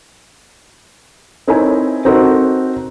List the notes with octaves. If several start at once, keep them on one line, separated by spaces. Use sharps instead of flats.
C4 D#4 E4 A#4 C#5 G#5
C4 D#4 F#4 A4 A#4